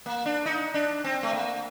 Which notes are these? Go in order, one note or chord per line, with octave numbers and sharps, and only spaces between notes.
A#3
D4
D#4
D4
C4
A3
A#3